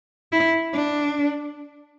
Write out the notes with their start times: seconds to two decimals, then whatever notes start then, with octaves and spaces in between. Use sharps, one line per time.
0.32 E4
0.73 D4